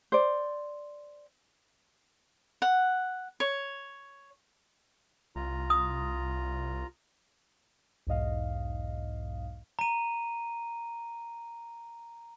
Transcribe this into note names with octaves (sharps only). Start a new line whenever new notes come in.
C5 D5
F#5
C#5
C2 F4 A#5
D#6
B1 E2 G#2 D#5 F5
A#5 D#7